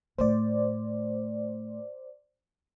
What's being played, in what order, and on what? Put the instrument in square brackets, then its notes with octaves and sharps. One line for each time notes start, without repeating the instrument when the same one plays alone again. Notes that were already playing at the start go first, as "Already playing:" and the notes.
[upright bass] A2 A3 [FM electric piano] C5 D5